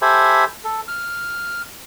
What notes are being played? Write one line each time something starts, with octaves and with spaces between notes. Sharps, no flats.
G4 A4 C5 E5 G#5 B5
A4
F6